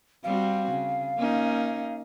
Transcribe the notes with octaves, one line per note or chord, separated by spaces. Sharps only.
G3 C4 F#4 F5
C#3
A#3 C#4 D#4